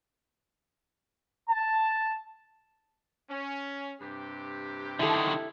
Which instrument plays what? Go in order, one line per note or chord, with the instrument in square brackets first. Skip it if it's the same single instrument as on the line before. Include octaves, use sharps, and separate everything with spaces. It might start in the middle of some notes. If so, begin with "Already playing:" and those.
[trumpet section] A5
[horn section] C#4
G2 C3 G4
[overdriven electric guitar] D3 D#3 [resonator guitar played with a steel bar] E4 A4